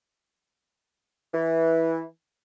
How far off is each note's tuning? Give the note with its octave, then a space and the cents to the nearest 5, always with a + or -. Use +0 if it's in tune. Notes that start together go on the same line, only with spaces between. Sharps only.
E3 -10